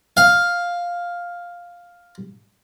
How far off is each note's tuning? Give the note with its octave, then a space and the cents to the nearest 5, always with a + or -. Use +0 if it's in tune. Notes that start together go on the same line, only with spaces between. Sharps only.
F5 +5